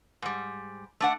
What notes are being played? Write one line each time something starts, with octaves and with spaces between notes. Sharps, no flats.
G#2 G3
A3 D4 F#5